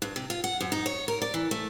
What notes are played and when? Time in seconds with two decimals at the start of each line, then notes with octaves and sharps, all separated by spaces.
0.02 G2
0.16 C3
0.30 F4
0.44 F#5
0.61 F#2
0.72 D#4
0.86 C#5
1.08 A#4
1.22 D5
1.34 E3
1.51 A3